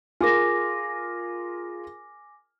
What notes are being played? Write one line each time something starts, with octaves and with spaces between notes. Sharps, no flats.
F4 G#4 A#4 G#5 D6 A#6